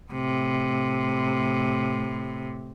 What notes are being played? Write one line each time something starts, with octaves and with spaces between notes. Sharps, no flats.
A2 C3